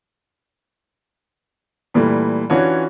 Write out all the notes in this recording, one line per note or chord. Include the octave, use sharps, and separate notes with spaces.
A#2 E3 G3 A3
E3 C#4 D4 F4 F#4 C#5